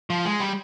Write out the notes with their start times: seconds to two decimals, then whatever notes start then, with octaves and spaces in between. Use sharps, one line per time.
0.10 F3
0.25 G#3
0.40 G3